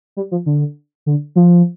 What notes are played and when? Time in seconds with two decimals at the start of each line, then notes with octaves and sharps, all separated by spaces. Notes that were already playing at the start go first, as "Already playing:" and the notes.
0.17 G3
0.31 F3
0.46 D3
1.06 D3
1.36 F3